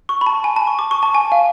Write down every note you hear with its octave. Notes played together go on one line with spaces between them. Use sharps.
C#6
B5
A5
G#5
A5
C#6
D6
C#6
A5
G#5
F5